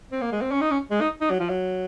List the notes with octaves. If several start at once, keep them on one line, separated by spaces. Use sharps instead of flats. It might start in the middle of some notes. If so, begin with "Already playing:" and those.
C4
A#3
G#3
C4
C#4
D#4
C#4
G#3
D#4
D#4
F#3
F3
F#3